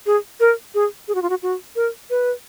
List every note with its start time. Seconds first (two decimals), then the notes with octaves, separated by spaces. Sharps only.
0.06 G#4
0.40 A#4
0.75 G#4
1.08 G#4
1.15 F#4
1.22 F4
1.30 F#4
1.43 F#4
1.76 A#4
2.10 B4